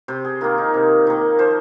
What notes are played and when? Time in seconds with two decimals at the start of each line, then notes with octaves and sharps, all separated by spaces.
0.08 C3 C5
0.24 G#4
0.41 D#3 A#3 F4
0.58 D#4
0.74 C3
1.07 D#3 A#3
1.39 F3 C5